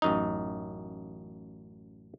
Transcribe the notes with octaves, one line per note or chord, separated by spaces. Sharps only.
A1 F#2 D#4